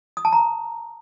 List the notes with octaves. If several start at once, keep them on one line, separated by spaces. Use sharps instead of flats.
D#6
A5
A#5